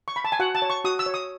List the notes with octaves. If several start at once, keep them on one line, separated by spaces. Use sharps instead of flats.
C#6
B5
A5
G#5
F#4 F#5
A5
C#5
C#6
F#4 D#6
E6
C#5
D#6